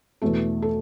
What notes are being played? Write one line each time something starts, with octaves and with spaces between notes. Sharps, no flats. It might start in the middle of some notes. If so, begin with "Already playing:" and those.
E2 B2 A3 A4
A4